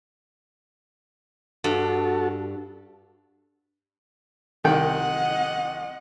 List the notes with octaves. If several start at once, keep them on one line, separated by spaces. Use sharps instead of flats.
G2 F#4 A4
C2 D#3 D#5 F#5 G5